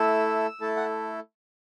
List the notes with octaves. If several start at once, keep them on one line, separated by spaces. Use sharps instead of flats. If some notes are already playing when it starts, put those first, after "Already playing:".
Already playing: A3 E4 A4 E6
A3 E4 A4 A5
F#5